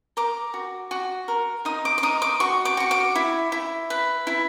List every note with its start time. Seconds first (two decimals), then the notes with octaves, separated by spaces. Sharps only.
0.17 A#4 D6
0.54 F#4
0.91 F#4
1.28 A#4
1.65 D#4 D#6
1.85 D6
1.98 D6
2.03 D#4 D#6
2.22 D6
2.40 F#4 C#6
2.65 D6
2.77 F#4 C#6
2.91 D6
3.15 E4
3.52 E4
3.90 B4
4.27 E4